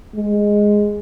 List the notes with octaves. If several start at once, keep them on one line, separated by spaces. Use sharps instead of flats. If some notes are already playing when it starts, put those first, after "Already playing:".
G#3